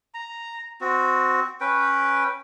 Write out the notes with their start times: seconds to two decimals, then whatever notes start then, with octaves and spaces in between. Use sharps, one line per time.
0.14 A#5
0.81 C4 F#4
1.61 C#4 B4 G5